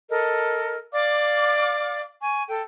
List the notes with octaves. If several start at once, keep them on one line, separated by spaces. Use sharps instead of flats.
A4 A#4 D#5
D5 F5 D6
G#5 C#6
A4 G5